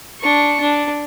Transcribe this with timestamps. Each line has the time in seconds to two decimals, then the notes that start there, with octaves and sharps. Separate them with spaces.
0.20 D4 C#6
0.60 D4